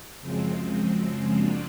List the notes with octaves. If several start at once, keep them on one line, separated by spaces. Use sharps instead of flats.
F#2 C#3 F3 G#3 C4
F#3 A#3 D4 F4